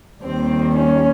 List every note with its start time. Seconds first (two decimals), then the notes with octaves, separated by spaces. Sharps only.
0.22 D#2 D#3 G3 C4
0.75 C#4